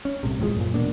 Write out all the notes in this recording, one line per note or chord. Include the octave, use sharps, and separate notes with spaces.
C#4
C2 A2 C3
D#1 A2 F3 G#3
F#2 A#2
E1 B2 A#3 D4